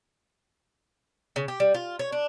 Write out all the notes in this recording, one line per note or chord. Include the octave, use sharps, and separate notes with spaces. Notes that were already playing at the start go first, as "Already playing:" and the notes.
C#3
G4
G3
F4
C#5
D4